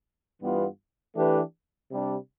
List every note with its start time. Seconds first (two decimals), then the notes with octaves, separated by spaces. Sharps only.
0.40 G2 E3 G3 B3 F4
1.16 E3 A3 D4 G4 B4
1.90 C3 G3 D4